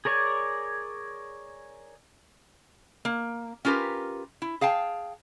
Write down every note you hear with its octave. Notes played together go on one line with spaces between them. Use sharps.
G#4 A#4 C#5 D5 G#5
A#3
C#4 F4 G4 A#4 B4
E4
G#4 F5 G5 A5